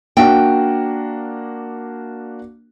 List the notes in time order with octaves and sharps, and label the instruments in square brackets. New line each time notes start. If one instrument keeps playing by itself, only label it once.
[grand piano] A#3 D4 F#4 [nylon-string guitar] G5